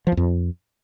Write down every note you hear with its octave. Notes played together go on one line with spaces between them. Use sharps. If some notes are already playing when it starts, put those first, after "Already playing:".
F3
E2
F2